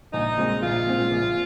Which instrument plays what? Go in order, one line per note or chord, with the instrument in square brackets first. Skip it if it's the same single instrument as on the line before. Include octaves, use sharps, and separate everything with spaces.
[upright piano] A#1 [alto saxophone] D#4
[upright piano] A#2 G#3 C4
[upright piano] A#1 [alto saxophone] F4
[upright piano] A#2 G#3 C4
A#1